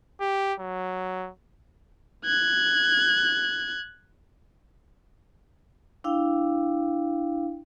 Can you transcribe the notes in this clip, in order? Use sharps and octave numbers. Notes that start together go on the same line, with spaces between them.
G4
F#3
F#6 G#6
D4 E4 F5 G5